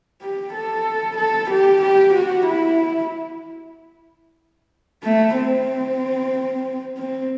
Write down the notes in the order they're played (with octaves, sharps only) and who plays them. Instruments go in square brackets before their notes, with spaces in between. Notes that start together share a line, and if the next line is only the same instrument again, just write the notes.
[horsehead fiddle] G4
A4
A4
G4
G4
F#4
E4
A3
C4
C4